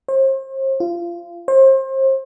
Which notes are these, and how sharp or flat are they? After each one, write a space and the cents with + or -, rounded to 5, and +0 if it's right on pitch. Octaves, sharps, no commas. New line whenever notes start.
C5 +40
F4 -25
C5 +35